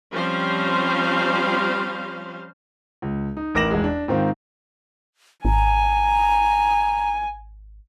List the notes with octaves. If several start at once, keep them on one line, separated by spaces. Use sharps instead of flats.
F3 G3 C4 C#4 C5 F5
C#2
D#4
A1 A#4 D6 A#6 E7 F#7
E1 G#3
D4
G#2 D#3 C4 F4
G#1 G#5 A#5